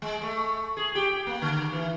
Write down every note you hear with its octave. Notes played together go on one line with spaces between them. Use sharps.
G#3
A3
G#4
G4
A#3
D3
E3